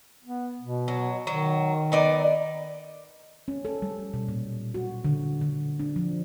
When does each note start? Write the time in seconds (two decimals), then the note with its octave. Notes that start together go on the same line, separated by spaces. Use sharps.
0.24 B3
0.61 B2
0.88 F#3
1.27 D#3 F#3
1.92 B3 D#4 D5
3.48 C#4
3.65 A4
3.82 G3
4.14 B2
4.28 A#2
4.74 F#4
5.05 D3
5.41 D3
5.80 D4
5.96 F3